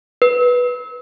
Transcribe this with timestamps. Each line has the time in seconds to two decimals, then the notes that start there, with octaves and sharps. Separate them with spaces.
0.22 B4